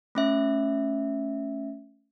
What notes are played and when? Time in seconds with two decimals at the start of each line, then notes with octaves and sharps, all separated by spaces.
0.15 A3 C#4 E5